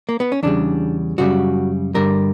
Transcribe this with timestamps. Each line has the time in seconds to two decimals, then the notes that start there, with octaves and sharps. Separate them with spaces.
0.09 A#3
0.20 B3
0.32 C#4
0.43 E2 C#3 G3 D4
1.18 F#2 C#3 G3 F#4
1.94 G2 D3 G3 A#4